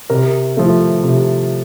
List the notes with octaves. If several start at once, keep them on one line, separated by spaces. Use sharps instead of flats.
C3 A#4
F3 A3
C3